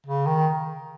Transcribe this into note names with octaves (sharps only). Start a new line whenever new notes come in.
C#3
D#3